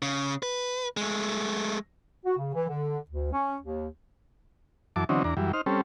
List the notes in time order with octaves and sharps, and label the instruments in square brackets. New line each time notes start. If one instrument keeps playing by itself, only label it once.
[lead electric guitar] C#3
B4
G#3 A3
[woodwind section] F#4
C#3
E3
D3
D2
C#4
D#2
[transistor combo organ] F#2 E3 A5 D6
D3 E3 F#3 C4 C#4 D#4
E2 D4 A#5
F#2 E3 G3
D#4 C5 F6
G3 C4 C#4 A4